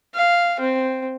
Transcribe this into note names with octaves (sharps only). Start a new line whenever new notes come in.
F5
C4